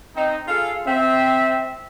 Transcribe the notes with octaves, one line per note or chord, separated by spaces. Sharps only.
C4 D#4
F4 G#4 A4 F5
C4 E5